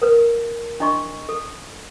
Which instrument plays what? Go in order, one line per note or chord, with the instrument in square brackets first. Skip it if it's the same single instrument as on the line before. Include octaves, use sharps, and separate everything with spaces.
[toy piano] A#4 B4
D4 E4 D#5 C6 C#6
A4